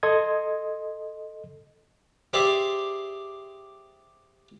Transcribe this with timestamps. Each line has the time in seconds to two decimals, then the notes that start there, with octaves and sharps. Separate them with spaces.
0.03 A4 D#5 C6 D#6 G#6
2.33 G4 G#4 C5 D5 E5